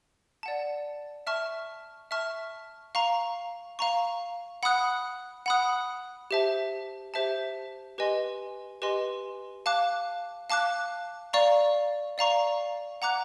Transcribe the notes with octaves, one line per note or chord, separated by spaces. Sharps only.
D5 F#5 A5
E5 A5 C#6 F6
E5 A5 C#6 F6
F5 A#5 C#6
F5 A#5 C#6
F#5 B5 D#6 F#6
F#5 B5 D#6 F#6
G4 C5 E5 A5
G4 C5 E5 A5
G4 B4 D#5 G#5 C6
G4 B4 D#5 G#5 C6
F5 A5 D6 F#6
F5 A5 D6 F#6
D5 F5 A#5 C#6
D5 F5 A#5 C#6
F#5 A#5 D6 F#6